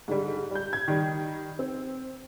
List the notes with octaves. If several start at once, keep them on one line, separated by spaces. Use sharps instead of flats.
G#2 D3 G3
G3 G6
G#6
D#3 G3
C4